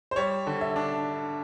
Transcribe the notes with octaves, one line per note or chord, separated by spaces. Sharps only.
C5
G3 C#5
D3
E5
D4